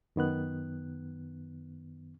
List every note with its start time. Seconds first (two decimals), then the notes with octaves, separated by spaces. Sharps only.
0.16 F#2 D#3 B3 F#6